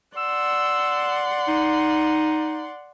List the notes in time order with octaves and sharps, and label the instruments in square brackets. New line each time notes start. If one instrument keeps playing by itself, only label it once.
[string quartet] D5 F#5 C6 [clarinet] E6
[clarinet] D#4